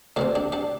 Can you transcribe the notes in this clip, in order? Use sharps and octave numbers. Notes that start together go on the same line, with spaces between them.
D2 D3 C4 D4 G4
D4 G4
D4 G4